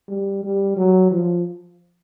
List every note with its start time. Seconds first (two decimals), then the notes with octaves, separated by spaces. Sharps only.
0.08 G3
0.43 G3
0.77 F#3
1.11 F3